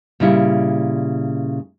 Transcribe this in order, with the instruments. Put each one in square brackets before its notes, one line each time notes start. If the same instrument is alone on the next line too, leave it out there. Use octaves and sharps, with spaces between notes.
[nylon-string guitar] A#2 C#3 G3 E4